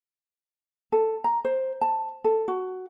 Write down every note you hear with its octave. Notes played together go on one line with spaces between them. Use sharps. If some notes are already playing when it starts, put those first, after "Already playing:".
A4
A#5
C5
A5
A4
F#4